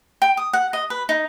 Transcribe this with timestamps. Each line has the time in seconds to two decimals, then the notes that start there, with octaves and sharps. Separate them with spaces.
0.22 G5
0.37 D#6
0.53 F#5
0.73 D#5
0.90 B4
1.09 D#4